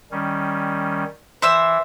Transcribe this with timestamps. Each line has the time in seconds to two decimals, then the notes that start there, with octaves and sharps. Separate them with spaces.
0.11 D#3 G3 C#4
1.42 E3 C5 E5 E6